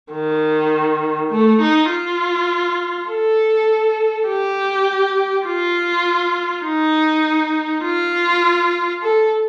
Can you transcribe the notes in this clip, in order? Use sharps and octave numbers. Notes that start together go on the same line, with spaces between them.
D#3
A3
D#4
F4
A4
G4
F4
D#4
F4
A4